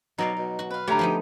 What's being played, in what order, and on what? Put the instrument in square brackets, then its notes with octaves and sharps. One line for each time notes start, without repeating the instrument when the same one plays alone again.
[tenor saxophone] B2 [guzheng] F#3 D5 F5 [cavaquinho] D#4
[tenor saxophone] B2
[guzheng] F#4
[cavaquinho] B4 F5
[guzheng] D3 A3 [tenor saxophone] G4 [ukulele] C#5 A#5
[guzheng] F3 B3 D#4